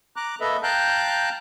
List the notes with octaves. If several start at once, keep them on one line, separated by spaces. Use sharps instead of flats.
A#5 D6 F#6
A#3 A4 B4 D#5 E5
F5 G5 A5 A#5 F#6 G6